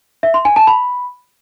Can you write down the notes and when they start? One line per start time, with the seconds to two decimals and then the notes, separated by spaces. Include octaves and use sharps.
0.23 E5
0.34 C6
0.45 G#5
0.56 A5
0.67 B5